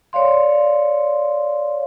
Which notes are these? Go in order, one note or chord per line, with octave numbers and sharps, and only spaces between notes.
C#5 D5 F5 C6